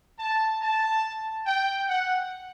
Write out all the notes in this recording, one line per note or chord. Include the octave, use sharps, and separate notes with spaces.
A5
A5
G5
F#5